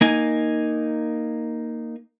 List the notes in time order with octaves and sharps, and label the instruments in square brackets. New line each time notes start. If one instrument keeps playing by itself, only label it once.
[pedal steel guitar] A#3 D#4 G#5